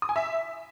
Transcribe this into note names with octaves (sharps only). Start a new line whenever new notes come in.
D#6
G#5
E5